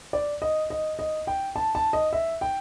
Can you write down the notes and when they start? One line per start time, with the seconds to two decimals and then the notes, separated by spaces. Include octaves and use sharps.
0.13 D5
0.42 D#5
0.70 D#5
0.99 D#5
1.27 G5
1.56 A5
1.75 A5
1.93 D#5
2.13 E5
2.41 G5